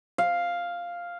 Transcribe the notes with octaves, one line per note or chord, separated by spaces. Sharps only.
F5